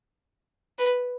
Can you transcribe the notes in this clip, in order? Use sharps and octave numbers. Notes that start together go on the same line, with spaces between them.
B4